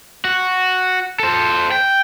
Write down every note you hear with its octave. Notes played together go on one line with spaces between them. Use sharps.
F#4
A4 C5
G5